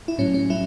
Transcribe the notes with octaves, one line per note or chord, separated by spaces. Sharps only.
E4
A2 F#3 C#4
C#4
F#3 E4